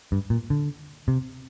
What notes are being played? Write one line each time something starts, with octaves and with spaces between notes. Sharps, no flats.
G2
A#2
D3
C3